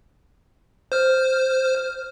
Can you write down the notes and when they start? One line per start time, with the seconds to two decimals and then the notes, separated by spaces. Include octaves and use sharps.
0.92 C5 F6